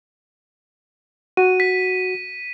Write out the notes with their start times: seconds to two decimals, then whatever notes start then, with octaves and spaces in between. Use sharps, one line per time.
1.37 F#4 D#7
1.60 B6